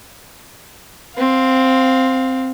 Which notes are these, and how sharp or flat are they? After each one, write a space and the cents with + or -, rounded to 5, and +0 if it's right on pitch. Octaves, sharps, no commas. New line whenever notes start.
C4 +0 F5 +20